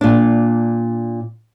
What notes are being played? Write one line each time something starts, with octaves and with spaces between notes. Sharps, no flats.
A#2 D4